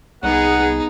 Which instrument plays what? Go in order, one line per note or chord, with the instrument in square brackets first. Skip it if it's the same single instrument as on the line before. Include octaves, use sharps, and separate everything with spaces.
[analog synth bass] C2 [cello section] B3 G#4 [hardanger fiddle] D#4 [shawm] F#5